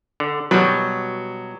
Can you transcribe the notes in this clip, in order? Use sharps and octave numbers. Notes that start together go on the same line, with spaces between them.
D3
B2 F#3 G3